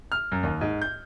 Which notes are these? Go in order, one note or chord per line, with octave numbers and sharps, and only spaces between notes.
F6
F#2
D#2
G#2
G6